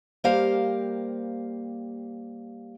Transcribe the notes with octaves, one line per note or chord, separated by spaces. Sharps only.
G3 A#3 G4 A#4 C5 F5